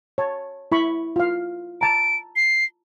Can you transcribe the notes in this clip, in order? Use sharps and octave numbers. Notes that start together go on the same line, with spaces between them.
C#5 A5
E4 B5 C#6
F4 F5
A5 A#5 D7
C7